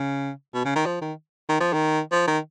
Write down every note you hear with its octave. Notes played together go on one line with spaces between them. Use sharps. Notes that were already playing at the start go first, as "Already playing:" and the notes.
Already playing: C#3
B2
C#3
D#3
F3
D#3
D#3
F3
D#3
F3
D#3